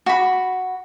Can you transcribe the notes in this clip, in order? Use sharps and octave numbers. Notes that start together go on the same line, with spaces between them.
F#4 B5